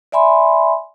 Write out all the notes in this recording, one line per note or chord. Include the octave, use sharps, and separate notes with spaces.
D5 E5 G#5 B5 C6